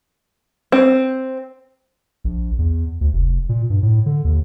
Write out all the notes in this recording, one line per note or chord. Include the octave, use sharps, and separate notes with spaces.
C4
A#1
E2
D2
F1
A#2
G2
A2
D3
D#2